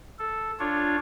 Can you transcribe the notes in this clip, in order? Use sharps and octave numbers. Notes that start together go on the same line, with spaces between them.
A4
D4 F4 C#5